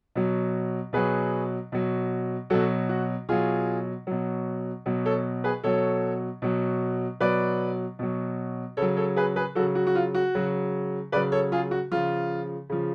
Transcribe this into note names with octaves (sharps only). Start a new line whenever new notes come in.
B2 F#3
B2 F#3 G#4 B4
B2 F#3
B2 F#3 F#4 A4
F#4
B2 F#3 F4 G#4
B2 F#3
B2 F#3
A4 C#5
G#4 B4
B2 F#3 A4 C#5
B2 F#3
B2 F#3 B4 D5
B2 F#3
C#3 F#3 A4 C#5
A4 C#5
G#4 B4
G#4 B4
C#3 F#3 F#4 A4
F#4
F#4
F4
F#4
C#3 F#3
C#3 F#3 B4 D5
A4 C#5
F4 G#4
F#4
C#3 F3 F4
C#3 F3